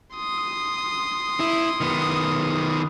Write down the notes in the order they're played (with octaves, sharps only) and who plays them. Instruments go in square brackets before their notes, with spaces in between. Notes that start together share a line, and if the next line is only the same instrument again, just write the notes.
[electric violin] C6 D#6
[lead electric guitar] E4
D#3 B3